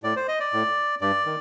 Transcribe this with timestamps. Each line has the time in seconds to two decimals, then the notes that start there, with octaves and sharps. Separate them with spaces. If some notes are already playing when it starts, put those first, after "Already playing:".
0.03 A2 D5
0.16 C5
0.28 D#5
0.40 D5
0.53 A2
1.01 G2 D5
1.26 D#3